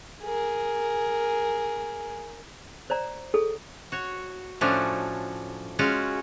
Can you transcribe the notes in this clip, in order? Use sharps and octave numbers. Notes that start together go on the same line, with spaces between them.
G#4 A#4
C5 D5 A#5
G#4 A4
F#4 C#5
A2 F3 A3 C#4 D4 F#4
G#3 C#4 F4 F#4